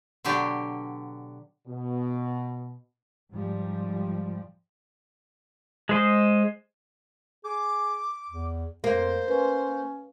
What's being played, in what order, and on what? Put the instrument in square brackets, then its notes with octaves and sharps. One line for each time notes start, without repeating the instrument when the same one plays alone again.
[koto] B2 D3 F#3 G4 G#5
[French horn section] B2
[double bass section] G#2 F3 G3
[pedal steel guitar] G#3 C5 D#5
[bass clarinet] G#4 [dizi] D6
[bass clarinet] E2
[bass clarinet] F2 [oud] A#3 [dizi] C5
[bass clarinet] C#4 [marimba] B4